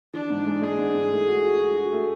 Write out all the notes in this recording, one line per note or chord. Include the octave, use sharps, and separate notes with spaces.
E3 D4
G#2
G#3
G#3 G#4
G#2
G#2
A3
F#4
F#4
F#4
F#4
A3